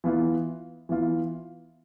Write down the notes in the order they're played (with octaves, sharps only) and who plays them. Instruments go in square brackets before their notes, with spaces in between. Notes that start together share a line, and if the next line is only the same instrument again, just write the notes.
[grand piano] E3 B3 F4
E3 B3 F4